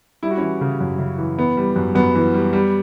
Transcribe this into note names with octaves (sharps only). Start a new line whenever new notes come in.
G3 E4
F#4
E3 C#4 E4
C#3
F#2
C#3
E3
E3 B3
G3
F#2
F#2 B3
E3
G3
G3